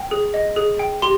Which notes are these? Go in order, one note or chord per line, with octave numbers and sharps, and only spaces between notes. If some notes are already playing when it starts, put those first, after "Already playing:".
Already playing: G5
G#4
D#5
G#4
G5
G4 C6